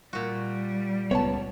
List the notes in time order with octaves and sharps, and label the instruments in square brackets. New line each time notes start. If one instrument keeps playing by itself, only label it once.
[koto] A#2 F#4 [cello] G3
[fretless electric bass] C#2 B3 [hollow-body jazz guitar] C#5 A5